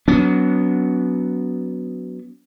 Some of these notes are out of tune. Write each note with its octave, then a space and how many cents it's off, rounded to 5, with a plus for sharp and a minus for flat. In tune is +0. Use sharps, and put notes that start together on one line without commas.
F#3 +0 B3 +0 D4 -45